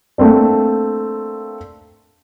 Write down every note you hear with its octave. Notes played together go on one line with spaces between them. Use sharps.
A3 A#3 C4 D4